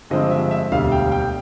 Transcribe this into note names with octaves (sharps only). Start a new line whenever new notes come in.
G2 D3 F3 G#3 C4 D#5
E5
E5
E1 D2 D3 G3 F5
G5
G5